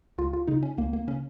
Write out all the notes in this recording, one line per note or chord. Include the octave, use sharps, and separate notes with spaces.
C#2 F4
F4
C#3 D#4
C#4
C#2 A#3
A#3
C#3 C#4